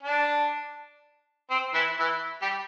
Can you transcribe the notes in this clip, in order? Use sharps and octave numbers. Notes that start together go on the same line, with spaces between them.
D4
C4
E3 E4
E3 E4
G3 G4